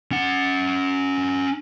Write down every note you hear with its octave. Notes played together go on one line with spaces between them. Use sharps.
C#4 F#5